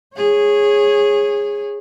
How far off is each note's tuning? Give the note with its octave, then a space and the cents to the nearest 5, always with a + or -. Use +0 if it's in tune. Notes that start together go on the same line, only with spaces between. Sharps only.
G#4 -10 C#5 -20